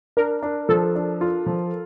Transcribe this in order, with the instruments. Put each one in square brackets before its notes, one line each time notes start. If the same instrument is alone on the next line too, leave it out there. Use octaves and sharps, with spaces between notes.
[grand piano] D4 [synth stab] A#4
[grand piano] D4
[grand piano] F3 [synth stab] A4
[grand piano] D4
F4
F3